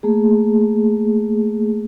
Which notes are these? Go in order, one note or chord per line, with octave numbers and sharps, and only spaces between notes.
A3 A#3 G#4